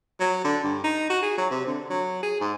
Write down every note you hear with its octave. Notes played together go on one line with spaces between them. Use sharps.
F#3
D3
G2
D#4
F#4
G#4
F#3
C3
D3
F#3
G#4
G#2